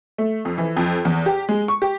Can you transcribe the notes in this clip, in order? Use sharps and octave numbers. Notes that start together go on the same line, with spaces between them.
A3
F2
E3
F2
E2
G4
G#3
C#6
G4